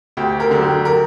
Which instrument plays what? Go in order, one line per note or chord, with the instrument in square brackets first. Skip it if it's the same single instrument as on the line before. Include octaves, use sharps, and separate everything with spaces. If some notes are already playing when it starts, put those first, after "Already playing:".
[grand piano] D2 G4
A#4
D3 F#3
G4
A#4